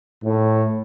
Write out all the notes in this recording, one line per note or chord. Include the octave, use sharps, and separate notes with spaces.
A2